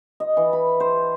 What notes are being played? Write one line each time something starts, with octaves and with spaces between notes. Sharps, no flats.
D#5
E3
B5
C5